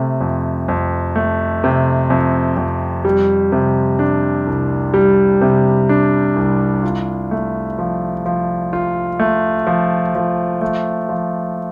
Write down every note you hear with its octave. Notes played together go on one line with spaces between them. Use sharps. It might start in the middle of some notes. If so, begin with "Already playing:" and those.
Already playing: C3 A3
F2
F2
A3
C3
F2
F2
G3
C3
D4
C2
G3
C3
D4
C2
F4
A3
F3
F3
F4
A3
F3
F3
A3
F3